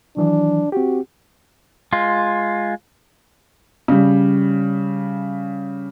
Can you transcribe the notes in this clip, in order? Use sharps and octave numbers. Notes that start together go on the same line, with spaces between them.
D#3 E3 F#3 D4
C4 F#4 G4
G#3 F4
C#3 G3